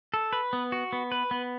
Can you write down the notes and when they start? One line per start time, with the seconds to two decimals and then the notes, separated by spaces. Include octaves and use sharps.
0.14 A4
0.33 B4
0.53 B3
0.72 F#4
0.93 B3
1.12 B4
1.31 B3